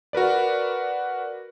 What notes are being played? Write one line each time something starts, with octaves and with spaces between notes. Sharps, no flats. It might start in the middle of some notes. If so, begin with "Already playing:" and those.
F#4 A#4 B4 D5